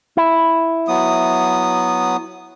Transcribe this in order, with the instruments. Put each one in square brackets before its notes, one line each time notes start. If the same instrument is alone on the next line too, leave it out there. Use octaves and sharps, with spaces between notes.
[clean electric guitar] E4
[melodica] F#3 B3 D#6